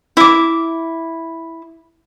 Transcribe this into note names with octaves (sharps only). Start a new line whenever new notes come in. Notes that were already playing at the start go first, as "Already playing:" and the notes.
E4 D6